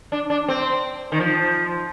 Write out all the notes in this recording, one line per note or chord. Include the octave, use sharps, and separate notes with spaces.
D4
D4
C4
D#3
F3